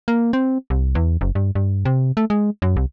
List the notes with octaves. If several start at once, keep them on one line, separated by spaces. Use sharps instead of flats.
A#3
C4
C2
E2
F#1
G2
G2
C3
A3
G#3
F#2
C2